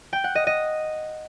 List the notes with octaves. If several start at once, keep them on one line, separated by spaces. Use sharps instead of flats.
G5
F#5
D#5
D#5